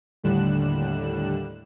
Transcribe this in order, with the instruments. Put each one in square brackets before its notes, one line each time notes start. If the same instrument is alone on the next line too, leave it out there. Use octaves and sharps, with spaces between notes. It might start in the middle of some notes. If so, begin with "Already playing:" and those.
[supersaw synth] D#2 A2 D3 G3 F#6 E7